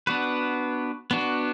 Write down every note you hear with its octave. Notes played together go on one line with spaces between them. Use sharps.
B3 D4 F#4 B4
B3 D4 F#4